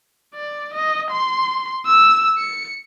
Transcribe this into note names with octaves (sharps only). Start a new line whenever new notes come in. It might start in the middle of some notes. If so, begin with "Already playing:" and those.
D5
D#5
C6
E6
C#7